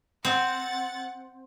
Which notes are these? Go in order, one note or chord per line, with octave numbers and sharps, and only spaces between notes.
C4 F#5 A6